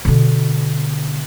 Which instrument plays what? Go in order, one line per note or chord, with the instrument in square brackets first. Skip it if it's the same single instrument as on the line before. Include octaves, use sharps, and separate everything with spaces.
[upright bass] B2 D3